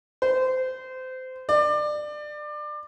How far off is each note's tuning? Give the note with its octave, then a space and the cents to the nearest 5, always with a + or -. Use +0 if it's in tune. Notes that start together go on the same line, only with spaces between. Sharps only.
C5 -25
D5 +25